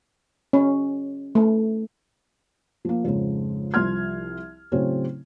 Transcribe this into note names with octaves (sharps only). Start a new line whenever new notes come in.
C#4
A3
F3 A#3
F2 G#2 C#3
C2 F3 C6 F6 G#6
A2 C#3 F#3 C4 C#4